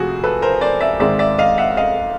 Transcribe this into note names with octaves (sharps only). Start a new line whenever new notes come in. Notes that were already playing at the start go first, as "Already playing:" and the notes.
Already playing: F2 C3 F3 A3 F#4 G#4
A4 B4
A#4 C5
C5 D5
D5 E5
G#2 D#3 G#3 C4 D5 E5
D5 E5
D#5 F5
E5 F#5
D#5 F5